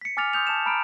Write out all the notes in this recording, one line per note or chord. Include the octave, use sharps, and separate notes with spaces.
B6 C#7
G#5 D6 F6 A6 C#7 F7
C6 D#6 G6 F7
A5 E7
A#5 B5 F6 D7